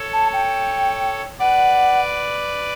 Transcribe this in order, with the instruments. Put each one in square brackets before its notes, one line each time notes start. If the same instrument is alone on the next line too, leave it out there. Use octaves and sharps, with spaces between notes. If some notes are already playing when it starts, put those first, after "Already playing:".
Already playing: [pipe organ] A4 C#5
[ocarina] A5
G5
[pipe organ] B4 D5 [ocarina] F#5